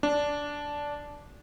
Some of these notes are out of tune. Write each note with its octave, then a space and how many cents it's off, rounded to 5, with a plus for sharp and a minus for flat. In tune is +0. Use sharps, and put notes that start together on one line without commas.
D4 -10